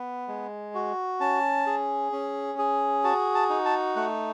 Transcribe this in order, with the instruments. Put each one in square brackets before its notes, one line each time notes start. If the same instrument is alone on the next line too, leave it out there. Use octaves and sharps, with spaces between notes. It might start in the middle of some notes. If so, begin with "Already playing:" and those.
Already playing: [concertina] B3
G#3
F#4
C#4 A5
G#4
C#4
G#4
F#4 A5
A5
D#4
A5
A3 F#5